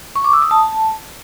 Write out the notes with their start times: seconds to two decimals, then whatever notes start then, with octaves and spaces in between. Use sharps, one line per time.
0.16 C#6
0.24 D6
0.33 E6
0.42 D#6
0.51 A5